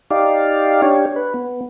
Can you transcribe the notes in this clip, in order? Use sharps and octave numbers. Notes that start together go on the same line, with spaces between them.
D#4 G4 D5 F5
D4 G4 C#5
B4
B3